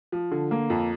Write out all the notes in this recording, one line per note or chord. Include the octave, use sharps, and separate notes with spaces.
F3
D3
A#3
F2